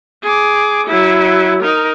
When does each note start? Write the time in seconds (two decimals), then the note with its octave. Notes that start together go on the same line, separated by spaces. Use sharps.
0.23 G#4 D6
0.87 F#3 E4
1.63 D#4 A#4